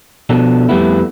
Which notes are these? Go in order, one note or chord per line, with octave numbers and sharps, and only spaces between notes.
B2 F3 D4 A4
F2 G3 A3 B3 E4